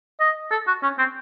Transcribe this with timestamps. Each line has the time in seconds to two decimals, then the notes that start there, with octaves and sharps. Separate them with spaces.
0.20 D#5
0.52 A4
0.67 F#4
0.83 C#4
0.99 C4